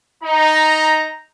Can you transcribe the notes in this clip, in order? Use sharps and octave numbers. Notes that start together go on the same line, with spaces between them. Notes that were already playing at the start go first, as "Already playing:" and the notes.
D#4 A#5